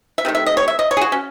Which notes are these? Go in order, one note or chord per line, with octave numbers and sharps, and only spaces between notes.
E5
C3 D#3 A3
E5
D#5
C#5
E5
D#5
C#5
G#4
F#4
C#4